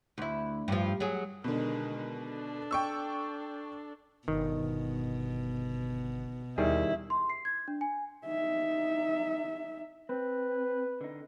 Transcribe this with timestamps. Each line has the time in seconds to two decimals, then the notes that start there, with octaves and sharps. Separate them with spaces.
0.18 D2 E4
0.68 G2 F3
1.00 F#3 G#4
1.44 B2 D3 D#3 G#3
2.20 D4 A4
2.71 G5 C#6 E6
4.28 G1 B2 D#3
6.58 D#2 D#3 G3 E4 G#4
7.10 C6
7.30 C7
7.45 G#6
7.68 D4
7.81 G#5
8.26 D#4 E5
10.09 C4 B4
11.01 D3 D#4